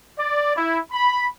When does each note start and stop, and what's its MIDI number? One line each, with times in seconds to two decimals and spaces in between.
0.18 0.56 74
0.57 0.78 64
0.91 1.27 83